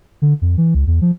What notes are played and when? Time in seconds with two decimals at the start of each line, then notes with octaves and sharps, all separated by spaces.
0.22 D3
0.42 F2
0.58 E3
0.74 C#2
0.87 E2
1.02 F3